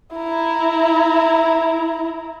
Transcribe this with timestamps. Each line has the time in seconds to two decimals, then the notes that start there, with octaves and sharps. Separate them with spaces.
0.16 E4 A#5